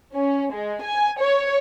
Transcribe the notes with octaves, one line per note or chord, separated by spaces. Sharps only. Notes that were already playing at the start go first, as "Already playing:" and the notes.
C#4
G#3
G#5
C#5